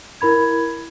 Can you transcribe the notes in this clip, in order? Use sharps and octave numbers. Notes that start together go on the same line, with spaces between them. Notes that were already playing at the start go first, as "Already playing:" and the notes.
E4 A#4 B5 G#6